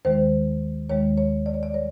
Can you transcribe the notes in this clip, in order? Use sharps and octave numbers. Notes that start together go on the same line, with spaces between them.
D#2 D#3 G#3 C5
D#2 D#3 G#3 C#5
C#5
D5
C#5
D5
G3 C#5